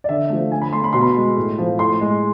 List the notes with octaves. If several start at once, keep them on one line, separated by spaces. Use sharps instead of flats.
D5
D3 E5
F3 A3
D3 G#5
B5
A3 C6
B5
B2 C6
B5
G#3
A2
F3 A3
A2 C6
G#3